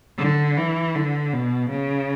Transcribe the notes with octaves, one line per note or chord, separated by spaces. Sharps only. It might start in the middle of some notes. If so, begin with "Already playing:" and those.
D3
E3
D3
B2
C#3